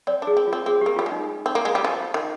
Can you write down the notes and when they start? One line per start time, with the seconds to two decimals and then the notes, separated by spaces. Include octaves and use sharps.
0.07 C4 D5
0.22 D4
0.27 G#4
0.37 C4
0.47 F4
0.53 C4
0.66 C4 G#4
0.81 A#3 G4
0.96 G3 F4
1.06 G#3
1.12 D#4
1.46 C4
1.55 A#3
1.65 G#3
1.75 G3
1.84 F3
2.14 D#3